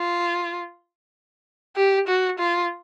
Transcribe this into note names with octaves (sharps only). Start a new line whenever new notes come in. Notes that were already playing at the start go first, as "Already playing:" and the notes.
Already playing: F4
G4
F#4
F4